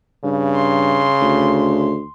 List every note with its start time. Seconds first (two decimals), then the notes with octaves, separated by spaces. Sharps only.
0.24 G2 C#3
0.56 C6
1.21 D2